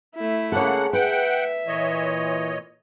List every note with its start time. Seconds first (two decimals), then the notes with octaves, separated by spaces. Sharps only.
0.15 A3 E4
0.52 C#3 A#3 G#4 A4 C#5 F#5
0.93 B4 E5 F#5 G5
1.67 A#2 E3 C#5 D#5